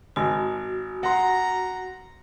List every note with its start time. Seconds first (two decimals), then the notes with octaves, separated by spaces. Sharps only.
0.16 G#1 F#4
1.03 F#5 A#5 C6